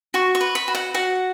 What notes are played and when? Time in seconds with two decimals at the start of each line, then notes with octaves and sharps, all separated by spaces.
0.14 F#4 C#6
0.35 C#6
0.41 B4
0.55 B5
0.68 F#4
0.75 F#5
0.94 F#4 F#5